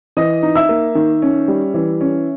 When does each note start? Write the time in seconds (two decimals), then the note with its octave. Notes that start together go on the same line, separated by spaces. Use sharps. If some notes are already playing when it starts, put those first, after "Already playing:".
0.17 E3 D#5 D#6
0.43 D#4
0.55 E5 E6
0.69 A#3
0.95 D#3
1.22 C#4
1.48 G3
1.74 E3
2.01 C#4